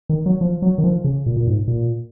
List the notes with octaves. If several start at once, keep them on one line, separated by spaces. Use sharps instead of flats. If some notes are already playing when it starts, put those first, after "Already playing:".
D#3
F#3
F3
F#3
D#3
F3
C#3
A#2
A#2
G#2
A#2